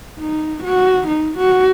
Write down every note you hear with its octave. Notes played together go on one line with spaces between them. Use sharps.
D#4
F#4
D#4
F#4